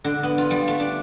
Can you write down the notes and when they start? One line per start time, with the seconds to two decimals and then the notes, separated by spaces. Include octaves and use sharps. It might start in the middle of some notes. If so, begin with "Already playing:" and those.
0.04 D3
0.23 B3
0.38 F4
0.50 G3
0.68 A3
0.80 D4